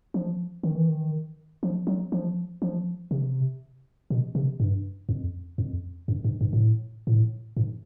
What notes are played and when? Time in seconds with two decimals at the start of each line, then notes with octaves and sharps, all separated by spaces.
0.14 F3
0.63 D#3
0.76 E3
0.89 D#3
1.63 F3
1.87 F#3
2.12 F3
2.62 F3
3.11 C3
4.10 B2
4.35 C3
4.60 G2
5.09 F2
5.58 F2
6.08 F#2
6.24 G2
6.41 G2
6.53 G#2
6.57 A2
7.07 A2
7.57 G#2